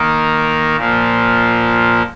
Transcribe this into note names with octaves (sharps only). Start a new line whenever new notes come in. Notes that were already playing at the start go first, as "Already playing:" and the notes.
Already playing: D#3 A#3 D#4 A#4
A#2 F3 A#3